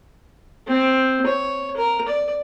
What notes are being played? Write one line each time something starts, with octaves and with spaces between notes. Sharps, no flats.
C4
C#5
A#4
D5